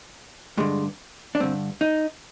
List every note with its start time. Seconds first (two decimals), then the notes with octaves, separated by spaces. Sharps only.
0.58 G2 D3 G#3
1.35 D4
1.40 G2 D3 C4
1.81 D#4